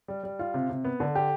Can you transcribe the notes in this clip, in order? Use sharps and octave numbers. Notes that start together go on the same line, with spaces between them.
G3
G3
F4
C3
C3
B3
D3
G4